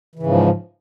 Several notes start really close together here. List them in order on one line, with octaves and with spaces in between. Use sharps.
E3 C#3 G#2 F3